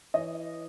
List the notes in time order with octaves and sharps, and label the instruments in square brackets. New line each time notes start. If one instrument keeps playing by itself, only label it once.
[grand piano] E3 [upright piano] C#5 D#5